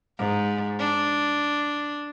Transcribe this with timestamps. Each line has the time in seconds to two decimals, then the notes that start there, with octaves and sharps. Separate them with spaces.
0.18 G#2
0.79 D4